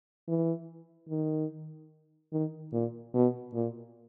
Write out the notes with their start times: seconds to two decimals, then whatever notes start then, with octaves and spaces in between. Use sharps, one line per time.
0.28 E3
1.09 D#3
2.32 D#3
2.73 A#2
3.14 B2
3.54 A#2